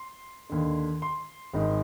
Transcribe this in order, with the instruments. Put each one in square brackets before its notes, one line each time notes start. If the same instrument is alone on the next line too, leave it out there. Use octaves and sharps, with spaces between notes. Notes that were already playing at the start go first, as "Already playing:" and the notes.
Already playing: [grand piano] C6
D#2 D3
C6
G#1 G#2 D#3